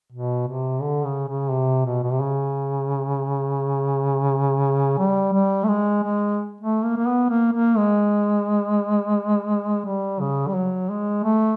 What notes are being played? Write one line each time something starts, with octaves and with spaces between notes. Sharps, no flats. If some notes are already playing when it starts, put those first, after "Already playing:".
B2
C3
D3
C#3
C#3
C3
B2
B2
C3
C#3
G3
G3
A3
G#3
G#3
A3
A#3
A#3
B3
A#3
A#3
G#3
G3
C#3
G3
F#3
G#3
A3